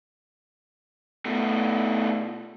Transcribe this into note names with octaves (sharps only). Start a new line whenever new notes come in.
B2 A3